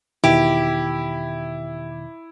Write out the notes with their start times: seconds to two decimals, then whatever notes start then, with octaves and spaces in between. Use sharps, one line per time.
0.24 E2 B2 D#3 E4 G4